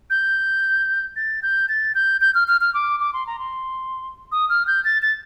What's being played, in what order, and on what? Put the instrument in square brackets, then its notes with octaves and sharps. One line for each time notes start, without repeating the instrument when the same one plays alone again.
[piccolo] G6
A6
G6
A6
G6
G6
F6
F6
F6
D6
D6
C6
A#5
C6
D#6
F6
G6
A6
A6